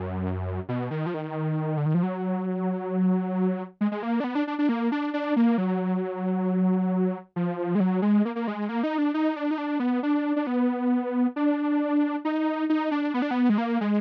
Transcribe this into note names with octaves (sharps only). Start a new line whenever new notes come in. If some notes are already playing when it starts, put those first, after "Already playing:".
Already playing: F#2
B2
D#3
F3
D#3
D3
D#3
F3
F#3
G#3
G#3
A#3
D4
B3
D4
D4
D4
A#3
D4
D4
A#3
F#3
F3
G#3
F#3
G#3
A#3
A#3
G#3
A#3
D#4
D4
D#4
D4
D#4
D4
B3
D4
D4
B3
D4
D#4
D#4
D4
B3
D4
B3
G#3
A#3
G#3